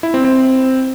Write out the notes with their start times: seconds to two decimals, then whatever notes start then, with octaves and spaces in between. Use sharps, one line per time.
0.03 E4
0.14 C4
0.24 C4